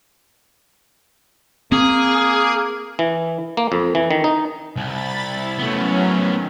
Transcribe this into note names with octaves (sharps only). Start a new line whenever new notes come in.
A#3 C4 G#4
E3
A#3
F2
E3
D#3
D#4
C2 B5 A6
E4
F#3 A3 B3 C#4
D#3